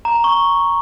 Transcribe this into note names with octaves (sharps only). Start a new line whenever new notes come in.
A#5
C#6